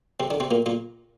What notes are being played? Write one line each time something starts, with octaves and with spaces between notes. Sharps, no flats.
C3 C4
D3 D4
C3 C4
A#2 A#3
A#2 A#3